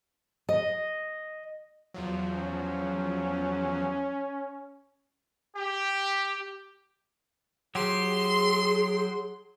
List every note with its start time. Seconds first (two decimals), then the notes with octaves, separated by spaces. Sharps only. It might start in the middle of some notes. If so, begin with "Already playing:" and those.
0.49 D#5
1.94 E2 F3 F#3
2.35 C#4
5.56 G4
7.75 F#3 G4 G#4 C6